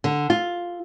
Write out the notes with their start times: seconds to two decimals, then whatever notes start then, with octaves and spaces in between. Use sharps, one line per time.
0.04 D3
0.30 F4